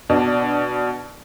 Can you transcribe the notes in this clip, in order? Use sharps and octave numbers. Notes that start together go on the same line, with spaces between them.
B2 D4